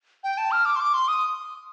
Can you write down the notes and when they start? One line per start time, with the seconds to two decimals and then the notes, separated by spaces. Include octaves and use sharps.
0.24 G5
0.38 A5
0.52 F6
0.66 D6
0.76 C6
0.80 D6
0.94 C6
1.08 D#6